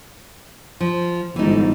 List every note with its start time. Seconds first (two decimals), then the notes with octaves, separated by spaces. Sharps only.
0.80 F3
1.36 G1 G#2 E3 D#4